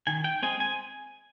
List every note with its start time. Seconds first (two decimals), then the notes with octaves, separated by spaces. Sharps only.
0.07 D#3 G#5
0.24 G5
0.43 G#3 C4 G#5
0.60 G#5